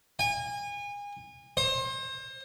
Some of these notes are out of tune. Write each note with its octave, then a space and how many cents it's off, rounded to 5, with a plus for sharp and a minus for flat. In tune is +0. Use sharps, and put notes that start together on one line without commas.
G#5 -30
C5 +30